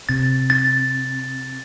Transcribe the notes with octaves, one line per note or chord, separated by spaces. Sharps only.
C3 A6
A6